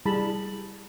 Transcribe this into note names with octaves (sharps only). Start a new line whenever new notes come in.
G3 E4 G#4 A5 B5